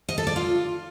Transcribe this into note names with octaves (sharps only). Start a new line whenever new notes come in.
D#5
A4
D5
F4